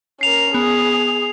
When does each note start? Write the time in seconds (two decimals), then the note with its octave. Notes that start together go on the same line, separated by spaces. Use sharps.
0.21 C#4 A#4 C7 F7
0.54 B3 G#4